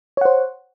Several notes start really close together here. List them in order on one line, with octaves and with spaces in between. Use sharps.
C#5 F#5 C5